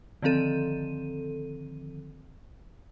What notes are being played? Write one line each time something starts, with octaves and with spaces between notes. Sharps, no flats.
D3 D#3 F3 C4 A4 D#7